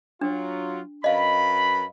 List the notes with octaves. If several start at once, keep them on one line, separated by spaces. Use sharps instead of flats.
F#3 D4 F4
F#2 B4 D#5 F5 B5